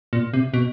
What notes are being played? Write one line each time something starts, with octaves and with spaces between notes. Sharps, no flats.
A#2
C3
B2